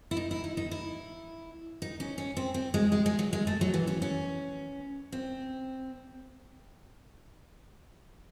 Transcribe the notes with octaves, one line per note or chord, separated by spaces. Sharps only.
E4
D#4
E4
D#4
D#4
E4
D#4
C#4
C#4
C4
C4
G#3
G#3
G#3
F#3
G#3
A3
F#3
E3
C#4
C#4
C4